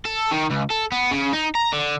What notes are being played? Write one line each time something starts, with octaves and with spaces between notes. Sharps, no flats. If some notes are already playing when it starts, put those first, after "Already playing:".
A4
D#3
C#2
A4
B3
C#3
D#4
A#5
D3